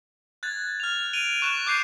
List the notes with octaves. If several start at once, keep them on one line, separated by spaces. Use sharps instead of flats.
F#6 G#6 A6
F6 F7
D7 D#7 F7 G7
C#6 F#6 E7
D6 F#6 G6 C7 D#7